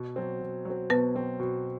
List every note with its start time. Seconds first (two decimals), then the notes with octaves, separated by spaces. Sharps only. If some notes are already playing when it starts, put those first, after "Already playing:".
Already playing: B2
0.16 F#3 C4
0.41 B2
0.65 F#3 C4
0.90 B2 B3 B4
1.15 F#3 C4
1.40 B2